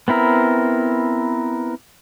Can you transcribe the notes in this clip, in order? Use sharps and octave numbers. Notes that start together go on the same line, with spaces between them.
B3 C4 E4 A#4